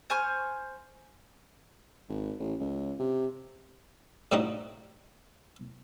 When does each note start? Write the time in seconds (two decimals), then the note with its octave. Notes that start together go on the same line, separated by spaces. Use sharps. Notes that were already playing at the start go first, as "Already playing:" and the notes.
0.10 C5 G#5 C#6 F6
2.09 G#1
2.39 A1
2.59 C#2
2.99 C3
4.32 A2 G3 C4 D#4 F#4